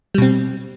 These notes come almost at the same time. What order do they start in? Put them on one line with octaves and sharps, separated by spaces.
G3 B2 C4